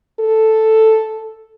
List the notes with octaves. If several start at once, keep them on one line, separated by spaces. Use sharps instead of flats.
A4